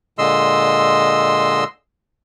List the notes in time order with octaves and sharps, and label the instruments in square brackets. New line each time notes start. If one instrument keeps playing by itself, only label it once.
[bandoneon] A#2 D3 G#3 D#5 C6 E6